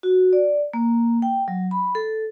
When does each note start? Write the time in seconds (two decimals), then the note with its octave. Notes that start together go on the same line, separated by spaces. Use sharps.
0.03 F#4
0.33 D5
0.73 A#3
1.22 G5
1.48 F#3
1.71 B5
1.95 A4